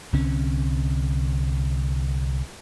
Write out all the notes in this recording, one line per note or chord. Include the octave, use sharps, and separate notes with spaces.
C2 D3 C4 C#4